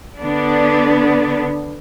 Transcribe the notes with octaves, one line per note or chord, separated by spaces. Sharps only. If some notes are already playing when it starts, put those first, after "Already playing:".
D3 B3 D4